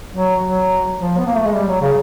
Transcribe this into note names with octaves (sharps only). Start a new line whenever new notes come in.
F#3
F#3
F3
B3
A#3
A3
G#3
G3
F#3
C#3